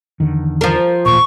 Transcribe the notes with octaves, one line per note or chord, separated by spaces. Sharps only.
E2 D3 D#3
F3 A#4
D#1 A1 A#2 C#6